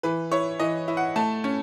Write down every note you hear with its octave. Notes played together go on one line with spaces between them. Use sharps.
E3 B4
E4 C#5
E3 D#5
E4
F#5
A3 A5
C#4